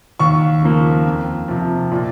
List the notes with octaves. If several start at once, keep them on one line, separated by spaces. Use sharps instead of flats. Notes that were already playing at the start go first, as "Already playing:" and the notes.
D#2 C#6
C#3 F3 A#3
F2
C3 F3
A#2